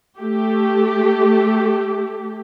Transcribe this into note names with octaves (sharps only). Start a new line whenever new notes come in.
A3 G4